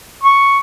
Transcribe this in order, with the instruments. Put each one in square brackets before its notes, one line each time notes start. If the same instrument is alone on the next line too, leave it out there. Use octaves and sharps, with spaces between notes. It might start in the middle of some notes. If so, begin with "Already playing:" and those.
[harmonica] C#6